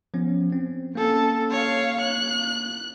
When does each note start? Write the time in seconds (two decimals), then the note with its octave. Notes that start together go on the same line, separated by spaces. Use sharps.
0.14 F3 B3 C#4
0.52 C4
0.95 A#3 C#4 A4
1.51 C#5 F5
2.01 F#6